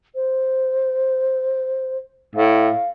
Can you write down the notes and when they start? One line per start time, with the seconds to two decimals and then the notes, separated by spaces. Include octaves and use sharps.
0.15 C5
2.36 A2 F5